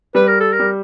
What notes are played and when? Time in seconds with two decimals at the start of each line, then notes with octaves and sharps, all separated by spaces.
0.15 G3 B4
0.27 A#4
0.40 A4
0.53 A#4
0.59 G3